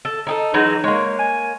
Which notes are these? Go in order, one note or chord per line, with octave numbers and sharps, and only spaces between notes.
A4
D#4 G#4 A4
E3 F#3 G#3 D#4
G#3 A#3 C#5
G#5